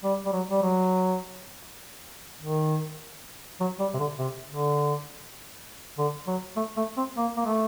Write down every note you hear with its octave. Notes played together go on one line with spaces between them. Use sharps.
G3
G3
F#3
G3
F#3
D#3
F#3
G3
C3
D3
C3
D3
D3
F#3
A3
A3
C4
A#3
A#3
A3